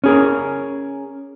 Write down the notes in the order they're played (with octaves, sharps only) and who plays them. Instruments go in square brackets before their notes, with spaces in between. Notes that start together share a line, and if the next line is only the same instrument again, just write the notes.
[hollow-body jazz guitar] C#4 G#4 A#4